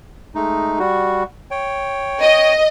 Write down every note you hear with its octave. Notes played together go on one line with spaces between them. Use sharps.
G#3 A3 D#4
G3 F#4
C#5 G5
D#5